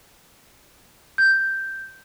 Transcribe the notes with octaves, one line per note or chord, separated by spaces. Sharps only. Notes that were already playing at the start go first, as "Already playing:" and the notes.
G6